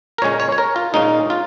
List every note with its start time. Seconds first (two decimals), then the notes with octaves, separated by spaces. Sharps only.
0.18 A#4
0.22 A#2 G#3 C#4 C#5
0.40 C#5
0.52 C#5
0.58 A#4
0.76 F4
0.94 A#2 G#3 C#4 D#4
1.30 F4